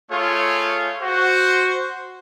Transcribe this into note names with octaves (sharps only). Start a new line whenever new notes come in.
A3 F4 G#4 C#5
F#4 C5